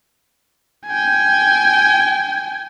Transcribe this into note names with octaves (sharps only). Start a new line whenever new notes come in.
G5 G#5